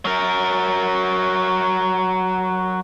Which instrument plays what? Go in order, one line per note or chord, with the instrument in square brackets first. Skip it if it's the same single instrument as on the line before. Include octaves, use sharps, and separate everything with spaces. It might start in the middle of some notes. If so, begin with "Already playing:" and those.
[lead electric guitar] F#3 A#4